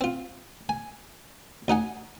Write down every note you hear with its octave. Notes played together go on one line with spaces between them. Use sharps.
C4 F4
G#5
D2 D#4 F#5 G#5